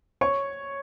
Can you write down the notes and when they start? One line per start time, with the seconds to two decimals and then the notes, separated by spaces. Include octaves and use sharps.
0.21 C#5 C#6